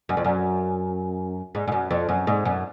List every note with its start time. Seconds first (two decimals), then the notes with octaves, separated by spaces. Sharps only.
0.09 F#2
0.17 F2
0.25 F#2
1.55 G#2
1.68 G#2
1.72 F#2
1.91 F2
2.09 F#2
2.27 G#2
2.45 F#2